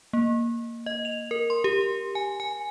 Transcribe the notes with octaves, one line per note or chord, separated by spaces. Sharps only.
A#3
D#5
F7
A#4
C6
G4
G#5
G#5